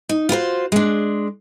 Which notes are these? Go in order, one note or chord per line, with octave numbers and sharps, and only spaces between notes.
D#4
F4 F#4 A#4 C5
G#3 D4